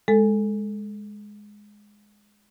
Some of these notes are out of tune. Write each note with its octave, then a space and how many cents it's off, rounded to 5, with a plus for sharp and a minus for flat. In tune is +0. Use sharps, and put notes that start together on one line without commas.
G#3 +0 A4 +0